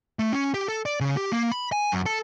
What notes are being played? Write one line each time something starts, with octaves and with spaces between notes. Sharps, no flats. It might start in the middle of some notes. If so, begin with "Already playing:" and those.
A3
C#4
G4
A4
D5
C#3
G4
A#3
B5
G#5
F#2
A4